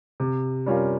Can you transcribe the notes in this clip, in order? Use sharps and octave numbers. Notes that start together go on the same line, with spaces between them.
C3
G3 C#4 F4 A#4